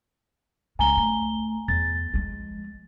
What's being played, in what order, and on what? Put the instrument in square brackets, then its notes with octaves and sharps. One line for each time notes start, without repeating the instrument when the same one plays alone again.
[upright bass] C#2 G#3 [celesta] G#5 A#5 G7
[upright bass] A3
[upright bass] E2 [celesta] A6
[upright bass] F3 G#3